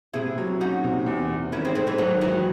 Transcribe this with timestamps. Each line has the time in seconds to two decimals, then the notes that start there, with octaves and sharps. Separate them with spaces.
0.14 C3 E4 G#4
0.38 F#3
0.60 C#4 D#4 F#4
0.84 C3
1.06 E2
1.29 C3
1.52 D#3 C#4 E4
1.65 G#3 C4
1.75 G#3 A3 C4
1.87 E3 G#3
1.98 G#2 D#3 F#3
2.21 D#3 E3 F#3